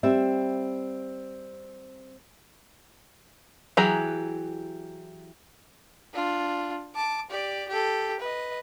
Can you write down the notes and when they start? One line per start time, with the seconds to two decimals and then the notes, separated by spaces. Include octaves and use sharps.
0.03 G3 C4 E5
3.77 E3 F#3 G4 G#4 A#5
6.14 D4 F4
6.95 A5 D6
7.30 G4 D5
7.69 G4 A4
8.20 B4 D#5